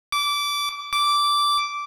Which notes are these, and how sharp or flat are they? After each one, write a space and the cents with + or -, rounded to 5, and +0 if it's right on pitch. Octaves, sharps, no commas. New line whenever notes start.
D6 -20
D6 -10